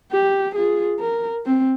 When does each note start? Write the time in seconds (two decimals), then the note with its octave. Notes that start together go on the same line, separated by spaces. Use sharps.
0.12 G4
0.55 F4 G#4
0.99 A#4
1.46 C4